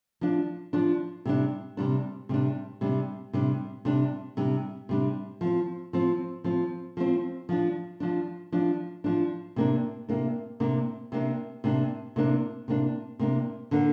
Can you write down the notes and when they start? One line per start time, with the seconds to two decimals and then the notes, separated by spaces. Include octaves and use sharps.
0.21 F3 D4
0.73 F3 D4
1.25 C3 G3 D4
1.77 C3 G3 D4
2.29 C3 G3 D4
2.81 C3 G3 D4
3.33 C3 G3 D4
3.85 C3 G3 D4
4.37 C3 G3 D4
4.89 C3 G3 D4
5.41 F3 C4
5.93 F3 C4
6.44 F3 C4
6.97 F3 C4
7.49 F3 D4
8.00 F3 D4
8.52 F3 D4
9.04 F3 D4
9.56 C3 A#3 D4
10.09 C3 A#3 D4
10.60 C3 A#3 D4
11.12 C3 A#3 D4
11.64 C3 A#3 D4
12.16 C3 A#3 D4
12.68 C3 A#3 D4
13.19 C3 A#3 D4
13.71 D3 A#3 D4